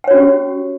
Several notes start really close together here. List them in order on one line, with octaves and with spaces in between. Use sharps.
G5 C#5 F#4 C#4 G4